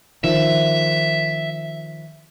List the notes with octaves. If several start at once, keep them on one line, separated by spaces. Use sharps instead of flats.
D#3 F3 E5